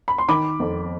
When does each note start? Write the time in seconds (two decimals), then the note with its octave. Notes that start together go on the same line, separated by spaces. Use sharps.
0.08 B5
0.18 C6
0.28 D#3 B5 D6
0.60 F2